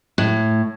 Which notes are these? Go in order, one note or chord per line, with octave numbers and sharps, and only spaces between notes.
A2